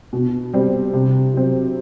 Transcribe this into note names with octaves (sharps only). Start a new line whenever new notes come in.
B2
G3 C4
C3
F#3 C4